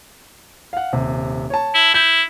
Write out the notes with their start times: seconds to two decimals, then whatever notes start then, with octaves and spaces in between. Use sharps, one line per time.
0.73 F5 F#5
0.93 D#1 C3
1.50 C#5 A5
1.74 E4
1.94 E4 G6